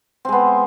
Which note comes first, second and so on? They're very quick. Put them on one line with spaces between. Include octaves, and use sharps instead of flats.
C4 G#3 B3